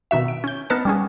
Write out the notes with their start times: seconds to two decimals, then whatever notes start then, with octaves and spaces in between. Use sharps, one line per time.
0.11 B2 D#3 F#4 E5
0.28 D7
0.44 C#4 G6
0.70 B3 D#4 A#4 B4 A5 C#7
0.85 G3 C#4 G#4